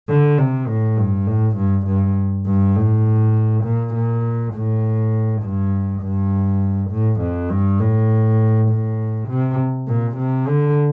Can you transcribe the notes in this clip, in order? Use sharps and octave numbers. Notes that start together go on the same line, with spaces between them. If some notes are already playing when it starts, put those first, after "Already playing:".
D3
C3
A2
G2
A2
G2
G2
G2
A2
A#2
A#2
A2
G2
G2
A2
F2
G2
A2
A2
C3
A#2
C3
D3